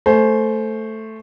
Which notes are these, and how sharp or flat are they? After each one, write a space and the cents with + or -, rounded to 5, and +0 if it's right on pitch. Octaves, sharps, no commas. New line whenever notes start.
A3 +0 C5 +0 G#5 +40